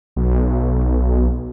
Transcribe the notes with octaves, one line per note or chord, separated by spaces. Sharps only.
B1